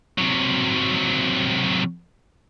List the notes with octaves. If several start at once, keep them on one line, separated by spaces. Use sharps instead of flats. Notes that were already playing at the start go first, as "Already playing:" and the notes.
C3 F#3